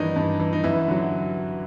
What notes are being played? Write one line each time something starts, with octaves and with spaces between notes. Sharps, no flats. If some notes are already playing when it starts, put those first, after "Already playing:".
Already playing: G2 D#3 E3 D4 D#4
G2
E3
D#4
F#2 E3 E4
D3 F#3